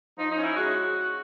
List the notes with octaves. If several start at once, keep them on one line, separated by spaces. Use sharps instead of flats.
F3 D#4
D#4
C#4
E4
G#3 F#4